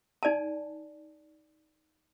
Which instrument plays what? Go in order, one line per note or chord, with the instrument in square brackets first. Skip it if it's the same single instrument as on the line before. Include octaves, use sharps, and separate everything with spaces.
[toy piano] D#4 D5 G#5 A5